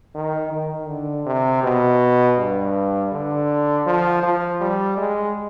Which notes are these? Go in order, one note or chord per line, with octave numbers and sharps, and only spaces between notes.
D#3
D#3
D3
C3
B2
G2
D3
F3
F3
G3
G#3